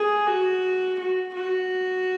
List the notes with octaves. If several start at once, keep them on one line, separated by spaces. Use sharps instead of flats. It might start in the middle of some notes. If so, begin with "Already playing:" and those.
Already playing: G#4
F#4
F#4
F#4